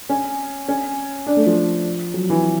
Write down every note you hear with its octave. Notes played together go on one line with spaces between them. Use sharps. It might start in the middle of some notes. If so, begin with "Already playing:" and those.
C#4
C#4
D4
A3
F3
F#3
E3